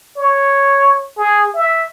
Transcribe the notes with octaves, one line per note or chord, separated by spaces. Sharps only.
C#5
G#4
E5